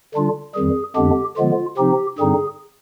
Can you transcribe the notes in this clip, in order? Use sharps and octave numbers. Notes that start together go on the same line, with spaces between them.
D3 G3 D4 F4
F2 D#3 G3 G#4
F2 D3 G#3 B3 D4 G4
D3 F3 G#3 B3 F4
C3 F3 C4 D#4 G4
G2 D3 G3 C4 D#4 G#4